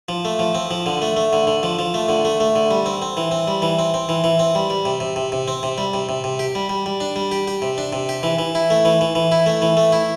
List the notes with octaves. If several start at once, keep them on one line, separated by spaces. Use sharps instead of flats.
F3
A3
F3
C4
F3
D3
A3
A3
D3
D3
F3
F3
A3
D3
A3
A3
D3
G3
C4
C4
E3
C4
G3
E3
C4
C4
E3
E3
C4
G3
G3
C3
C3
C3
C3
C4
C3
G3
C3
C3
C3
G4
G3
G3
G3
D4
G3
G4
G4
C3
D4
C3
G4
E3
E3
E4
A3
E3
E3
E3
E4
A3
E3
A3
E4